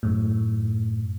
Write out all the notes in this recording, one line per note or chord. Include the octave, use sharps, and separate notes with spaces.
F#2 A2